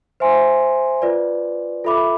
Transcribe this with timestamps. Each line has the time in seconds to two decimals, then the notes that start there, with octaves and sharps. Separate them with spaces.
0.20 C5 E5 G#5 C6
1.02 F4 B4 D5
1.84 F4 A4 E5 B5 D6